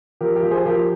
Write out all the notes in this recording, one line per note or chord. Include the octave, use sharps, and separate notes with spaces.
F3 G4 A#4
G4 A#4
F3
G#4 C5
F3 G4 A#4